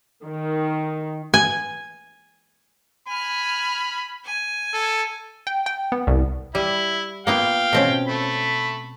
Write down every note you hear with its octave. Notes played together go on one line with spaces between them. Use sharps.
D#3
G#5
G#5 B5 F6
G#5
A4
G5
G5
B3
C2
G3 E4
A#3 B3 F4 F5 G5
B2 C4 C#4
A3 B5